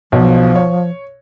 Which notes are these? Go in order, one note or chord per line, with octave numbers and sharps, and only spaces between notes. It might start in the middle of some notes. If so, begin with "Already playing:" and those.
B1 B2 F3
C#5